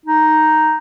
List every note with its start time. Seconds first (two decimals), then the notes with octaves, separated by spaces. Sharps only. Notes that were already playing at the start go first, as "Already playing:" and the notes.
0.06 D#4